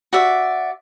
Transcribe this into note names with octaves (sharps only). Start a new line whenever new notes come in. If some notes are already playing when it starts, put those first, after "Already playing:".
F#4 D5 E5